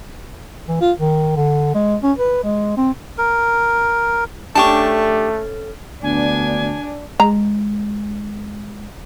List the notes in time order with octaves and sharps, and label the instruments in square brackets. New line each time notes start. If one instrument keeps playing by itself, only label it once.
[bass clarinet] E3
F4
D#3
D3
G#3
C#4
B4
G#3
C4
[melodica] A#4
[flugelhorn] A3 [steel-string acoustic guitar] C#4 A4 [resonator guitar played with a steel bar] D4 G4 [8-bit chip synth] A5 C#6
[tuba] D2 [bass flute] B3 [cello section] D4 [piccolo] G#5
[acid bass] G#3 [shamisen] A#5